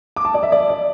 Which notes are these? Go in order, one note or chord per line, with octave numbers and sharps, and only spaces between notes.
D6
A5
D5
E5
D5
D5